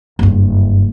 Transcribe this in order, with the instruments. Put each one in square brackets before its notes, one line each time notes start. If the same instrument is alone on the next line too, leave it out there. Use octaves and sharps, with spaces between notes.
[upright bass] F#1 G2